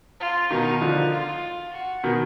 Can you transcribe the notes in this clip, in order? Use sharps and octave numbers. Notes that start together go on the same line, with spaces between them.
F4
B2 D#3 D#4
D3 F3
F4
F#4
B2 D#3